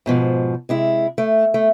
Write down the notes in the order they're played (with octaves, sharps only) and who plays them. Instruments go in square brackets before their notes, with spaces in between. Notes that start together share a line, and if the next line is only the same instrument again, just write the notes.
[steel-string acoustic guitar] G#2 B2 F3
C3 G#3 E4
A3
A3